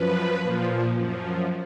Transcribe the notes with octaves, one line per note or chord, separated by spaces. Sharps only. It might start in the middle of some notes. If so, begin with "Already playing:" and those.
Already playing: F#2 F3 B4
A#2 F3
F#2 F3